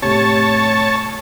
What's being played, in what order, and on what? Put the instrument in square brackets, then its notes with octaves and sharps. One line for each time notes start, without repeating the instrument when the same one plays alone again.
[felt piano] A2 C3 [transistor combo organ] C#5 A5